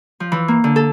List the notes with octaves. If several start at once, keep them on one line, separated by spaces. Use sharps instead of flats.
F3
E3
A#3
D3
A4